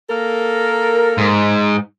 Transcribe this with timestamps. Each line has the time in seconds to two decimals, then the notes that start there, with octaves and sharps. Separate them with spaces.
0.10 A#3 A4 A#4
1.18 G#2